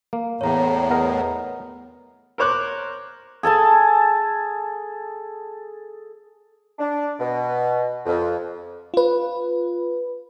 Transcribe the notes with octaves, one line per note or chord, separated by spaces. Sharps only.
A#3
E2 A2 C#5 A#5
B3 A#4 D#5
A#4 C5 C#5 D6 F#6
G#4 A4 G#5 A5
D4
B2
F2
F4 B4